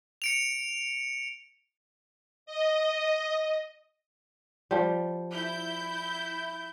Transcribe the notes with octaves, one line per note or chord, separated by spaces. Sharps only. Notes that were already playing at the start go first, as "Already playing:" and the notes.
C#7 D7 F7
D#5
F3 G3
E4 G6